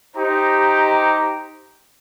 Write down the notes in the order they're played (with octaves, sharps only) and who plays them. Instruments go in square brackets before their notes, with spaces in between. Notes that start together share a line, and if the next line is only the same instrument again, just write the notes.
[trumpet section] D#4 G4 C5 A#5